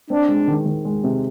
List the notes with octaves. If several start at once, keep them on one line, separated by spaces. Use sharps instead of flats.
C4 D4
G#3
D#3
D#3
G#3
C3